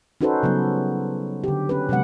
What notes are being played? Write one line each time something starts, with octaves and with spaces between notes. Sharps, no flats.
C#4 D#4 F#4 A4 B4 C5
C#3 F#3 G3 B3
D3 G4
C#4 G4 B4
C3 F#3 G#3 B3 F#5